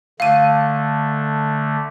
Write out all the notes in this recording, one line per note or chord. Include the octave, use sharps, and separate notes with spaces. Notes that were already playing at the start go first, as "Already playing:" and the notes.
D3 A3 F5 D#7